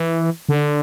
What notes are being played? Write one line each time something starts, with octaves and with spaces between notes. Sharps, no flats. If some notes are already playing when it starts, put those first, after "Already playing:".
Already playing: E3
D3